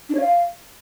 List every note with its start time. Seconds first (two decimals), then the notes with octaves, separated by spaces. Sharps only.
0.09 D4
0.15 C#5
0.20 F5